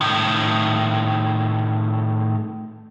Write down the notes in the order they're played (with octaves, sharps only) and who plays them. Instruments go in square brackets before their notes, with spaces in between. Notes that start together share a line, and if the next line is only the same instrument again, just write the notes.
[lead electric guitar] A2 D#3